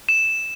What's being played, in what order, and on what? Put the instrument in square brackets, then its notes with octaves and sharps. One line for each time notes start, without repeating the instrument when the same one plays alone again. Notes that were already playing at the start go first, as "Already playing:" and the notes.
[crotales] E7